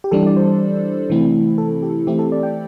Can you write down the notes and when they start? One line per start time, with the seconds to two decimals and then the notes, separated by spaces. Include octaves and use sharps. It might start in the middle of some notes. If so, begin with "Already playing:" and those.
0.04 G4
0.11 E3 G3 D4 A4
0.27 D5
0.37 C5
1.09 C3 E3 A3 C4 E4
1.58 A4
1.83 G4
2.07 E3 A3 C4 E4 G4
2.19 A4
2.32 D5
2.43 G5